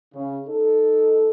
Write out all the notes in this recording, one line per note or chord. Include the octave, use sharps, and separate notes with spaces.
C#3
D#4 A4